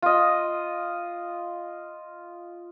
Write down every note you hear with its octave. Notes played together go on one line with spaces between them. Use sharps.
F4 D#5